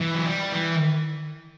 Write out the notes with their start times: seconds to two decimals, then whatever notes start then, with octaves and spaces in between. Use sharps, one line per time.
0.01 E3
0.16 F#3
0.27 G3
0.52 E3